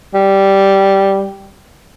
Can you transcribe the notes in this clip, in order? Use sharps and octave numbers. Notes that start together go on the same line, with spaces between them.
G3